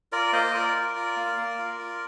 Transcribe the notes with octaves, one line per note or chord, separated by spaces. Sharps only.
F4 A#4 D5
A#3 C5 D#5
F4 A#4 D5
F4
F4
A#3
A#3
F4
F4